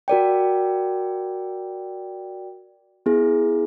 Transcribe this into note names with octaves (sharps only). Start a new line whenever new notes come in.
F#4 A#4 D5 G5
B3 E4 G#4